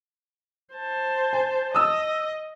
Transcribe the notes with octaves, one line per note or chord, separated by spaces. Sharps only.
C5 A5
G#5
D#5 D#6 E6